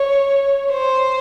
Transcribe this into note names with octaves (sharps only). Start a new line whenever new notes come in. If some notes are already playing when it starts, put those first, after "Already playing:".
Already playing: C#5
C5